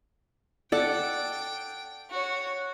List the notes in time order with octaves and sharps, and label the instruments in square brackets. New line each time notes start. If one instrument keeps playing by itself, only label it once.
[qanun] A4 F#5 A5 [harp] D5 [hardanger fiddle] G5
[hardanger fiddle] F#4 C#5